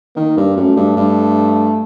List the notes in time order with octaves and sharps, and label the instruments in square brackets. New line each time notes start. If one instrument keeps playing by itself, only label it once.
[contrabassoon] D#3 [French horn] A#3
[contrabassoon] G2
[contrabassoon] F#2 [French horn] A3
[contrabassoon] G2
G2